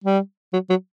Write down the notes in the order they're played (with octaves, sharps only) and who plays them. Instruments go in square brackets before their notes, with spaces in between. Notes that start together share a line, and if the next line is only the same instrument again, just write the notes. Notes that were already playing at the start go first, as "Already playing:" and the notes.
[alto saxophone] G3
F#3
F#3